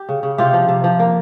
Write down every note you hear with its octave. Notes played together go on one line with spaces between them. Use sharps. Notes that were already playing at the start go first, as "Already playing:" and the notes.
Already playing: G4
C#3
C#3
C3 F4 G4
F3
C3
F3
A#3